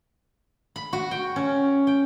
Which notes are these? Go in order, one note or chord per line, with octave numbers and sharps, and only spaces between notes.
B5
F#4
G5
C#4
G5